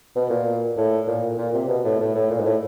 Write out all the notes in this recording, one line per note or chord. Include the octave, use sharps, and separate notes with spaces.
B2
A#2
A2
A#2
A#2
C3
B2
A2
A2
A2
A#2
G#2
A2